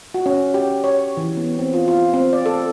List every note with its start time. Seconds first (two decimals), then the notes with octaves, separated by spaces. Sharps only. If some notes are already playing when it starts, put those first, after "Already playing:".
0.14 F#4
0.26 C#4
0.54 G4
0.84 C#5
1.17 E3
1.37 B3
1.59 C4
1.74 F4
1.88 F4
2.14 C4
2.33 D5
2.46 A4